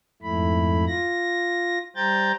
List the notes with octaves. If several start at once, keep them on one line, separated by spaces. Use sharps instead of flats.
F2 G#2 A3 E4 B5
F4 A#6
G3 C5 G5 A#5 G6 A6